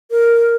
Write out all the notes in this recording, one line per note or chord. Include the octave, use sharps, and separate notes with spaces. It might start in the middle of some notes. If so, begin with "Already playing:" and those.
A#4